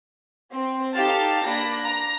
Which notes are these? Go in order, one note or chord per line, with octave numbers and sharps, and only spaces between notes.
C4
D#4 G4 A4 F5 A5
A#3 D4 D5 B5 A#6
A#5 A#6